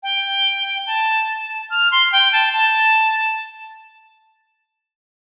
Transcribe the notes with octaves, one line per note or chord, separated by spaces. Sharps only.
G5
A5
F6
C6
G5
A5
A5